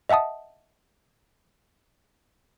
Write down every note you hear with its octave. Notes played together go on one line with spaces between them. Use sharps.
D#5 E5 F#5 A5 D#6